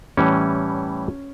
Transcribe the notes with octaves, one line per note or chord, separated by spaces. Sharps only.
A2 E3 G3 C#4